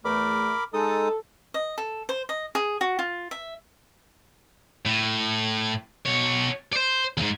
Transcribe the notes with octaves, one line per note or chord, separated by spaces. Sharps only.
E2 A3 A#4 B5 D6
G#3 D#4 A4 D#6
D#5
A4
C5
D#5
G#4
F#4
F4
E5
A2
B2 C#5
C5 D5
E2 G#2